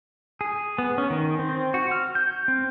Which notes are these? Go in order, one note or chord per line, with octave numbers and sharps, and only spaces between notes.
G#4
B3
C#4
D#3
C4
F#4
F6
G6
C4